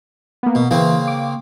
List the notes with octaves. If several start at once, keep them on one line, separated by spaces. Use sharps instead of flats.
A#3 B3
B2
C#3 E3 A#3 C4
D6